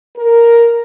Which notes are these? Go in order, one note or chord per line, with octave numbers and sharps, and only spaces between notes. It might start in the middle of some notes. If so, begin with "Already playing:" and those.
A#4